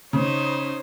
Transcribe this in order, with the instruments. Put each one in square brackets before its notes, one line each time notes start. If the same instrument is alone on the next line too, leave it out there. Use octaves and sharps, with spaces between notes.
[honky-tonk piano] C#3 [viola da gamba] D#4 C5 C#5